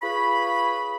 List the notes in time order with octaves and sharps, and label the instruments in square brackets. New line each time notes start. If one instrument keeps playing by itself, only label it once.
[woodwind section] F4 G#4 B4 C#5 B5